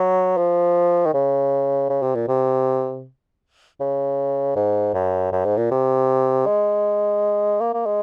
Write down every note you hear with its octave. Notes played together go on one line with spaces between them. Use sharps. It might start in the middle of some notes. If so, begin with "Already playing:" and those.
Already playing: F#3
F3
D#3
C#3
C#3
C3
A#2
C3
C#3
G#2
F#2
F#2
G#2
A#2
C3
G#3
A#3
A#3
G#3